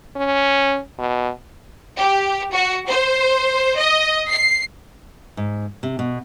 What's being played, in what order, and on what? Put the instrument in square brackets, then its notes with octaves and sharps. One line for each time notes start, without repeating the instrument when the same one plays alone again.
[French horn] C#4
B2
[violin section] G4
F#4
C5
D#5
C7
[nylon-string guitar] G#2
C3
B2